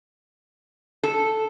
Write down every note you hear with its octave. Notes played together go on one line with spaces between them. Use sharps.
A4